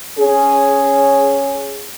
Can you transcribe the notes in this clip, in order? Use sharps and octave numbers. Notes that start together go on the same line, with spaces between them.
C#4 G#4